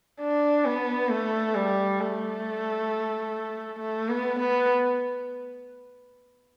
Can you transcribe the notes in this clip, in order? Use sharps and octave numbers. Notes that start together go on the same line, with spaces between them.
D4
B3
A3
G3
A3
A3
B3
B3